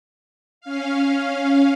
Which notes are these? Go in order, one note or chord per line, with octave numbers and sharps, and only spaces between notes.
C#4 F5